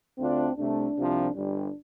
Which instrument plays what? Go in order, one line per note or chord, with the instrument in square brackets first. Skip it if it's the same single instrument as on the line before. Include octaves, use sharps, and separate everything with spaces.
[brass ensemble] D2 D3 A3 D4 F4 [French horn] C4
[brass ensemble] C2 C3 A3 [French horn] D4
[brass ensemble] C2 C3 F3
[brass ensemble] G1 G2 G3 [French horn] D4